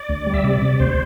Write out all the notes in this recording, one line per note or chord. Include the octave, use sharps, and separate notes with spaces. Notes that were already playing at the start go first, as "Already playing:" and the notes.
Already playing: D5
D2
G3
E5
C3 D5
C3
D2 C5